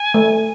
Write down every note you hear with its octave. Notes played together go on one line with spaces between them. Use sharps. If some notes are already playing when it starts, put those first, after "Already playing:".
Already playing: G#5
A3